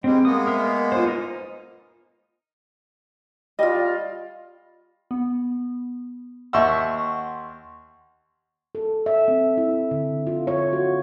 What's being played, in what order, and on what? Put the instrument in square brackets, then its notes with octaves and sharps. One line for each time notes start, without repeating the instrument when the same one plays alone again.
[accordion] G3 G#3 [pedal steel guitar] C4
[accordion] G#3 A#3 B3 [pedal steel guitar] D#6
[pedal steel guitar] A#4 E5 C6
F4 C5
D#4 A#4 D#5
[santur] G3 F4 [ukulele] D#5
[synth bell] B3
[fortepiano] D#2 E5 E6 [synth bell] F#5 C6 C#6
[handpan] A4
E5
C4
E4
D3
F4
C#5
F#4